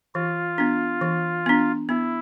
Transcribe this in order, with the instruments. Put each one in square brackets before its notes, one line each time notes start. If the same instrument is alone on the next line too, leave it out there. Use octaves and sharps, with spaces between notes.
[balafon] E3 [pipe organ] F4
[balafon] B3 D4
E3
B3 D4
[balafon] B3 [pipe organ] E4